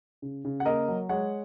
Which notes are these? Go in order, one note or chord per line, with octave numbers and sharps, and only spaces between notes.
C#3
C#3
F#5
A#3 A#4 D#5
F#3
G#3 C#5 F#5